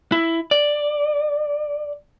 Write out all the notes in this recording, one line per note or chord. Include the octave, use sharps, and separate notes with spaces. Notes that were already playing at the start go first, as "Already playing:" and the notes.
E4
D5